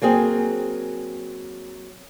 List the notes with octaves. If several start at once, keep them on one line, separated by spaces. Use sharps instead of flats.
F#3 A#3 C4 G#4